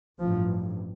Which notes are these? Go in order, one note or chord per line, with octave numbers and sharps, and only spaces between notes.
A1 G2 F3